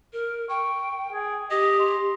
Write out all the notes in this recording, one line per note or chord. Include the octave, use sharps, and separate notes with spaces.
A#4
G5 C#6
G#4
G4 D#5
C6